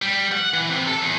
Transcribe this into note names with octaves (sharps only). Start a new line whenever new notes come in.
G3
F#5
E3
C3
A4
E2